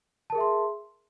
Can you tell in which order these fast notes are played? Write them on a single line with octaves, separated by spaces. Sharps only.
A5 A#4 G#4 E5 C6